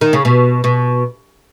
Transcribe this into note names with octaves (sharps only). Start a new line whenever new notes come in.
D#3
C#3
B2
B2